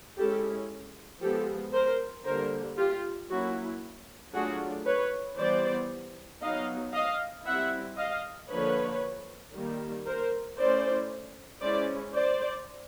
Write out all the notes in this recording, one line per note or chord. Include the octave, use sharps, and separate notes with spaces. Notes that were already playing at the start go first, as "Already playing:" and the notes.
G#3 C#4 E4 G4 A4
F3 G#3 B3 G4 A4
A#4 C5
D3 G3 A#3 A#4 C5
F4 G4
F#3 A#3 C#4 E4 F#4
F#3 A3 D4 F4 F#4 G#4
B4 C#5
E3 G3 B3 C5 D5
F#3 B3 D#4 D#5 F5
D#5 F5
G3 C4 E4 E5 F#5
D#5 F5
D3 F3 A#3 D4 B4 C#5
D#3 G3 A#3
A#4 C5
A3 C#4 E4 C5 D5
G#3 C#4 E4 C5 D5
C5 D5